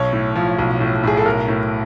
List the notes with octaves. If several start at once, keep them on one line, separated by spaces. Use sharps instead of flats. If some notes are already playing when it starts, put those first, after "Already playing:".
Already playing: B1 C#5
A2
F3
B1
A2
A2 G#4
A4
B1 A#4
A2